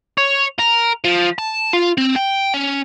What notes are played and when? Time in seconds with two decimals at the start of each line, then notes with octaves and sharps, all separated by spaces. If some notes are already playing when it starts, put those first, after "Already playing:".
0.17 C#5
0.59 A#4
1.05 F3
1.38 A5
1.73 F4
1.98 C4
2.16 G5
2.54 C#4